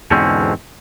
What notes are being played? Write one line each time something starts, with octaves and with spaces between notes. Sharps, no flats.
E2 G#2 B2 D3 C4 C#4